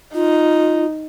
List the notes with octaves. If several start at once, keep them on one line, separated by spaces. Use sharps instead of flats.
D#4 F4